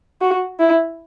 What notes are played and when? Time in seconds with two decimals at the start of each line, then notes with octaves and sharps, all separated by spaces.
0.21 F#4
0.59 E4